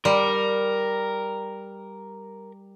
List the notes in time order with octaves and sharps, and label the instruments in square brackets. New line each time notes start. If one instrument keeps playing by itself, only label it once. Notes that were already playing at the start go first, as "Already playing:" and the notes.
[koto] G3 [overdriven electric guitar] A#4